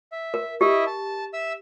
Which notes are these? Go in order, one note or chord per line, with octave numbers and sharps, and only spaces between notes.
E5
A#4
E4 G4 D#5 E5
A5
E5 E6